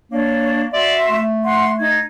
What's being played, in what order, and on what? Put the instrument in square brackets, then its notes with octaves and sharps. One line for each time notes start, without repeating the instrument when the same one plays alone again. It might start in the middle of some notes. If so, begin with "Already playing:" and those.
[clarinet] A#3 [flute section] D4 C#5
[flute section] F#4 E5 C6 [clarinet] D5
[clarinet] A3
[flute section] F#5 C6
D#4 G#6